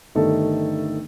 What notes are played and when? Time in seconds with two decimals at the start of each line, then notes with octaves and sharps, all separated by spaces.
0.15 G1 G2 D#3 A3 D4 A4